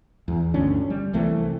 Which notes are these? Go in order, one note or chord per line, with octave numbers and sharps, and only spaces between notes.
E2
G1 D2 C#4 D4
G3
C2 E3 A3 C4